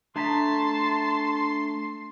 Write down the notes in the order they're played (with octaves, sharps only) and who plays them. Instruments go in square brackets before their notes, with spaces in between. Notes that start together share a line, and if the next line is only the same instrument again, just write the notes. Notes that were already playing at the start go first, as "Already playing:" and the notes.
[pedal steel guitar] A3 [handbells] D4 A#5 B6 [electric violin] A5 [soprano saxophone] C6